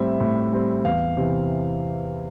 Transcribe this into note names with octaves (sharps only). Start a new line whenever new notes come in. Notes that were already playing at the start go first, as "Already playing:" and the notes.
Already playing: A2 G3 C4 E5
A2
G3 C4
E2 F5
C3 E3